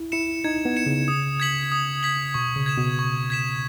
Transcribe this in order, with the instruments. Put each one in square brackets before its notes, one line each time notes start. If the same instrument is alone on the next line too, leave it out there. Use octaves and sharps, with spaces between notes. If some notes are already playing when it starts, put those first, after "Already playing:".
Already playing: [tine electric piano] E4
[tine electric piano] E4 [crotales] C#7 E7
[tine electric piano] D#4 [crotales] G#6
[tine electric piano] B3
[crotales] C#7 E7
[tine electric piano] C#3
[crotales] D#6
G#6 B6 F#7
D#6
G#6 B6 F#7
[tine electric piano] B2 [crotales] C#6
[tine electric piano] C#3
[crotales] G#6 B6 E7
[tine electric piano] B2
[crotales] C#6
G#6 B6 E7